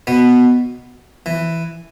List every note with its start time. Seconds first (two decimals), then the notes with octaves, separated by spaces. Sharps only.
0.07 B2 B3
1.26 E3